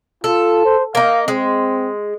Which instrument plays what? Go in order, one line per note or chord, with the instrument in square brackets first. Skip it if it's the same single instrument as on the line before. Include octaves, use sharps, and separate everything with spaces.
[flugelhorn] F4 [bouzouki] A4
[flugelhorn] C5
[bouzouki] A#3 D#4 [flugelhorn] F5
[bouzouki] G#3 [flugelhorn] C4